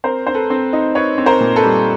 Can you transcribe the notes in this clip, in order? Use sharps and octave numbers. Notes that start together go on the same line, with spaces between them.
C4 A#4 C5
C4 C5
A4 B4
C4
D#4
D#4 B4 C#5
C4
A#4 C5
A#2
A4 B4
G3